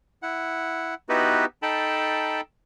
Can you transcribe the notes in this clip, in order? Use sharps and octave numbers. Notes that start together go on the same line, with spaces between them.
E4 F#5
B3 D#4 E4 F#4 G4 B4
D#4 A4 G5 A5 B5